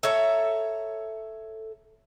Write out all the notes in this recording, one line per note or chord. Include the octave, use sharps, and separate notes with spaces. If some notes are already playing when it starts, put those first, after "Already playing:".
A4 C#5 E5 A#5